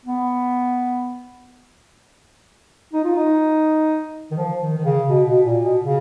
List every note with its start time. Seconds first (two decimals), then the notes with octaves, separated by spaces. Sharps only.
0.06 B3
2.93 D#4
3.04 F4
3.15 D#4
4.31 D#3
4.37 F3
4.61 D#3
4.78 D#3
4.85 C#3
5.09 B2
5.27 B2
5.45 A#2
5.63 B2
5.81 C#3